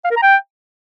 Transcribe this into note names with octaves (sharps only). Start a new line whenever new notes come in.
F5
A#4
A#5
G5